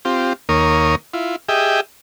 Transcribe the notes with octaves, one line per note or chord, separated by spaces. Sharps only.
C4 F4 G4
D#2 A#3 A#4 C#5 D#6
E4 F4
G4 G#4 D#5 E5 G5